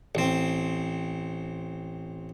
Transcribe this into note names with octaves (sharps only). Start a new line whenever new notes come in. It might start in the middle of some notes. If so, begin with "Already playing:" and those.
A1 C4